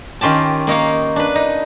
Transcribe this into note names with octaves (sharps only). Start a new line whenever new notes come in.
D#3 C#4 F4 G4 A5
A#3 D#4 C#5 F5
D4 B4
D#4